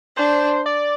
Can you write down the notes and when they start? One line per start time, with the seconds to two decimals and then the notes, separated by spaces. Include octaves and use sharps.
0.17 D4 C5
0.66 D5